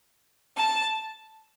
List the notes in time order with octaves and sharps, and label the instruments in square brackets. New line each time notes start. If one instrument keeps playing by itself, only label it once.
[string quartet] A5